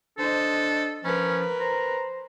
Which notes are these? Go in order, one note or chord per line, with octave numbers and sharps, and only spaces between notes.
D4 A4 C5 D#5
F3 C#4 A#4 B4
C5 A#5